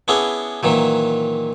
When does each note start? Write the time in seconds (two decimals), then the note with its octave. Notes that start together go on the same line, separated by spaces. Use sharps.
0.08 B3 C#4 D4 E4 G#4
0.63 A#2 D#3 E3 F#3